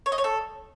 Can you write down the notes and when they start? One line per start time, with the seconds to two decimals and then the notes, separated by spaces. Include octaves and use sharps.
0.06 C#5
0.12 D#5
0.18 C#5
0.24 A4